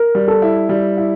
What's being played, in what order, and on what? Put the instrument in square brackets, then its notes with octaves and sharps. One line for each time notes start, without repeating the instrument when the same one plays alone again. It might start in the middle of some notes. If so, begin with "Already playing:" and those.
Already playing: [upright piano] A#4
[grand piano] G3
[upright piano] A4
[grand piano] E4
G3
E4